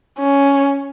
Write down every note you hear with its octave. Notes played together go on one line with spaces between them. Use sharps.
C#4